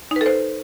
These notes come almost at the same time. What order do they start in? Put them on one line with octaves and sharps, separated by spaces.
D#4 B4 A4 C5